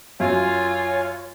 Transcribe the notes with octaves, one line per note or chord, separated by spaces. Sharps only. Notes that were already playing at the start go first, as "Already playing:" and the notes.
F#2 F4 C#5 F5 G#5